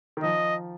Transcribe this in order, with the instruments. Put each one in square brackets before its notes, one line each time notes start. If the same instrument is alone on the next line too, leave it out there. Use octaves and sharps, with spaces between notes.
[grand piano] D#3
[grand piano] F3 [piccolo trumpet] D#5